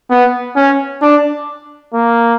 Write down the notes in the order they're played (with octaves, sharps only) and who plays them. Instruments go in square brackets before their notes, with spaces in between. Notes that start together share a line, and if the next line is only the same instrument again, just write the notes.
[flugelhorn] B3
C#4
D4
A#3